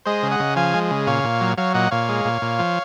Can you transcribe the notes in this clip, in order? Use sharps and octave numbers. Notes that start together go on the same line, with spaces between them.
G#3 C5 D#5
C#3
D#5 F#5
C#3
F3 F5 G#5
G#3
C#3
A#2 C#5 F5
A#2
F#3
F#3 C#5 F5
A#2 D#5 F#5
A#2 C#5 F5
G#3
A#2
A#2
F3